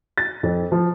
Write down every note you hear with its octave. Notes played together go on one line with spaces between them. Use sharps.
A6
F2
F3